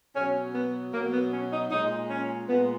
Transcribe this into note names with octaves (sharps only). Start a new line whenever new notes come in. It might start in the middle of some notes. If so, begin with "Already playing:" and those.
B2 F#3 C#4
B3
B2 F#3 A#3
B3
C#4
D#4
A#2 G#3 D#4
C#4
A#2 G#3 B3